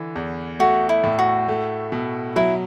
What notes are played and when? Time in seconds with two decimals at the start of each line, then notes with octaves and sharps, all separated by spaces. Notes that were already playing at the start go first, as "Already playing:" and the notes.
Already playing: D3 E3
0.16 E2
0.59 A3 F#4
0.89 E4
1.04 A2
1.19 F#4
1.48 A3
1.92 B2
2.36 F#3 E4